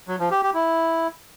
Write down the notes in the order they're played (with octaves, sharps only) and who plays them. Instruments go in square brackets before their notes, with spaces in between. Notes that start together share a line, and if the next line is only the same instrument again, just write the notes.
[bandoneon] F#3
F3
G4
G4
E4